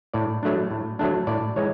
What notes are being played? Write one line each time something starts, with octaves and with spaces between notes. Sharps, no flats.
A2 D5
F#3 A3 D4
A2
F#3 A3 D4
A2 D5
E3 G#3 C#5